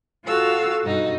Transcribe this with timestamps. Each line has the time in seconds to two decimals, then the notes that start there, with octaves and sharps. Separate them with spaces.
0.24 F4 F#4 A4 F5 E6
0.83 G2 B2 D#4 F#4